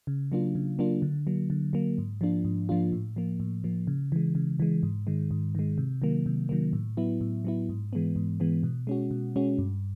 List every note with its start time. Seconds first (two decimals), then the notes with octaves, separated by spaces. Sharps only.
0.07 C#3
0.32 F#3 A#3 D4 F4
0.55 C#3
0.79 F#3 A#3 D4 F4
1.02 D3
1.27 F#3 A#3
1.50 D3
1.73 F#3 A#3
1.98 G#2
2.21 F3 A#3 D4 F4
2.45 G#2
2.69 F3 A#3 D4 F4
2.92 A2
3.16 F3 A#3
3.40 A2
3.64 F3 A#3
3.87 C#3
4.12 E3 G#3
4.35 C#3
4.60 E3 G#3
4.83 G#2
5.07 D#3 G#3
5.31 G#2
5.55 D#3 G#3
5.78 C3
6.02 D#3 F#3 A#3
6.26 C3
6.49 D#3 F#3 A#3
6.73 A2
6.97 F#3 B3 E4
7.21 A2
7.45 F#3 B3 E4
7.69 G#2
7.93 E3 G#3 B3
8.16 G#2
8.40 E3 G#3 B3
8.63 B2
8.87 G#3 C#4 F#4
9.11 B2
9.36 G#3 C#4 F#4
9.58 G2